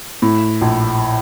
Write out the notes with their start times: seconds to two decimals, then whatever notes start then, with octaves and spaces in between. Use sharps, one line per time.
0.22 A2
0.61 A#1